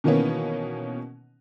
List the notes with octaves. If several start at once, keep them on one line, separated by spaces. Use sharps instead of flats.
B2 D#3 E3 A#3 B3 C#4